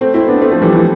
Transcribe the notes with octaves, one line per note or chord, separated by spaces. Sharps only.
A3 C4
C4 E4
B3 D4
A3 C4
F3 A3
E3 G3
E3